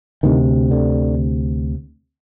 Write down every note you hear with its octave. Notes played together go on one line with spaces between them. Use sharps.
D2 C3 D#3
D3